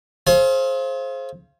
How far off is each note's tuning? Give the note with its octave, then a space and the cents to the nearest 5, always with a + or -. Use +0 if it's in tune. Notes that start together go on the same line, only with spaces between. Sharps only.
G#4 +40 C5 +25 F5 -25